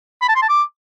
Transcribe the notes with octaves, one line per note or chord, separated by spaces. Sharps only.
B5
A5
C6
A5
D6